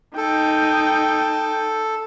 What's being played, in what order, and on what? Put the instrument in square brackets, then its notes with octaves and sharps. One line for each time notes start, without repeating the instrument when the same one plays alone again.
[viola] D#4 G5 [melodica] A4